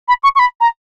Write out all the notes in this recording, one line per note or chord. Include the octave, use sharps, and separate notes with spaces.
B5
C#6
C#6
B5
A#5